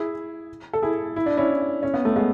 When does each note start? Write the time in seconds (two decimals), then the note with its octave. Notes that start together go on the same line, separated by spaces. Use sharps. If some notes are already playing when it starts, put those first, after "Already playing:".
Already playing: E4 G#4
0.73 A4
0.82 E4 G#4
1.16 E4
1.26 D4
1.37 C#4 E4
1.83 C#4
1.94 B3
2.05 A3
2.16 G#3 B3